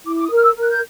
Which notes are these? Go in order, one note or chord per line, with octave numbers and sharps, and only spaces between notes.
E4 D6
D6
D#6
A#4
F6
E6
A#4
F#6
G6